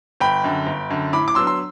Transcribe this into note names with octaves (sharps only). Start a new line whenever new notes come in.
G1 G5 B5
F#2 D3
G1
F#2 D3
A2 B5 D6
D6
F#3 B3 D4 C6 E6
C6 E6